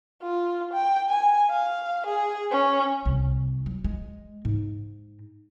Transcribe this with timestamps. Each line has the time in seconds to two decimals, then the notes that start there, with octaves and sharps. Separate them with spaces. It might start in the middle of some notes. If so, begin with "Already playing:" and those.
0.22 F4
0.73 G5
1.10 G#5
1.50 F5
2.06 G#4
2.52 C#4
3.05 C2
3.66 F#3
3.84 G#3
4.45 G#2